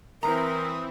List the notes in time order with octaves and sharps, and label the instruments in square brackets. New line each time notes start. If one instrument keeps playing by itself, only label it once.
[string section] E3 C4 E4 [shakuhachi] A#4 [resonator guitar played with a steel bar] A#5 [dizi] D#6